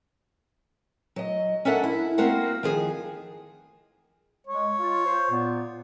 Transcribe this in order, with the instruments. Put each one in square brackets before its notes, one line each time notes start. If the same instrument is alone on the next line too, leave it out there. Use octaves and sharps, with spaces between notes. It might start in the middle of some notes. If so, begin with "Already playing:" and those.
[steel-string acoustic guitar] F#3 D#5
C#4 D4 A4 A#4 E5 F#5
E4
A#3 C4 F#4 A#4 F#5
D#3 F3 G#4
[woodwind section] G#3 [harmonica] C#5
[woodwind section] F4
C5
A#2 B3 F4